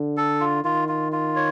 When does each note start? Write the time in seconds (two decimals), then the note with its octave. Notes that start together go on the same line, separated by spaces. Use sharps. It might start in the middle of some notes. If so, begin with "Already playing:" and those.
Already playing: D3
0.17 A4
0.40 F4
0.64 D#3 F4
0.88 F4
1.12 F4
1.36 C#5